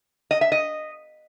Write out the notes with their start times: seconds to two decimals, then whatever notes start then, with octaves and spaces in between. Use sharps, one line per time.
0.31 D#5
0.41 E5
0.52 D#5